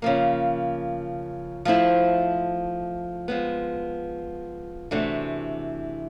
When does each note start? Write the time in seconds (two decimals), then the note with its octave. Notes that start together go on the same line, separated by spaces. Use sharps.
0.02 C#3 F3 A#3
1.65 F3 A3 C4 E4
3.28 F3 G#3 B3
4.91 C3 E3 A3 D4 F#4